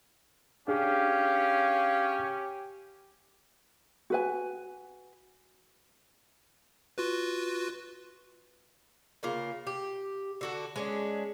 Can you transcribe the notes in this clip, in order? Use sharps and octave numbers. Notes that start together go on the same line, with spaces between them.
C#4 D4 G4 G#4 F5
F#4 B4 G#5
F4 F#4 B4
C#3 A#3 F4
G4
D3 F#4 A4
G#3 C#4 D4